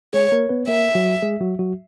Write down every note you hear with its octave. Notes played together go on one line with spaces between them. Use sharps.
G#3 G#4 C#5
A#3 A#4
B3 B4
A#3 A#4 E5
F#3 F#4
G#3 G#4
F#3 F#4
F#3 F#4